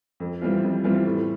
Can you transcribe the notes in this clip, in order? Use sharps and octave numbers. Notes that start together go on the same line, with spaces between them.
F2
E3 G3 C4 F4
F2
E3 G3 C4 F4
A2